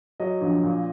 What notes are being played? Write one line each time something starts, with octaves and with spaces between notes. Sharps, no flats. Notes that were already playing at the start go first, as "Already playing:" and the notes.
F#3 D#5
A#1
A#2